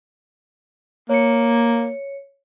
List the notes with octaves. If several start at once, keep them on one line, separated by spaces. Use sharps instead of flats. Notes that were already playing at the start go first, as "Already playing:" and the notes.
A#3 C#5 C#7